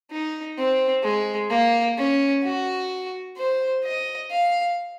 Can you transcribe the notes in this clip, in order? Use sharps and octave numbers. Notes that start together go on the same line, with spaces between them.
D#4
C4
G#3
A#3
C#4
F#4
C5
D#5
F5